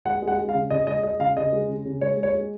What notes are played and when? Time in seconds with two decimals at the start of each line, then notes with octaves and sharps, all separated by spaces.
0.05 G#3 F#5
0.22 G#3
0.27 F#5
0.38 G#3
0.49 F5
0.54 C#3
0.70 C#3 D#5
0.87 G#3 D#5
1.03 G#3 D#5
1.19 C#3 F5
1.36 C#3 D#5
1.52 G#3
1.69 C#3
1.85 C#3
2.01 G#3 C#5
2.17 G#3
2.23 C#5
2.34 G#3